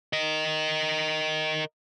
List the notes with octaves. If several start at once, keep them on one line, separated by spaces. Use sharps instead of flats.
A#4 D#5